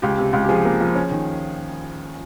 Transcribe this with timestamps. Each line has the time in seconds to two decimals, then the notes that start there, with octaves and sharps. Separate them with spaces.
0.02 C#2 G4
0.18 C3
0.33 C#2
0.44 G4
0.49 F3 G#4
0.65 A#3
0.80 F3
0.95 C#4
1.11 D#3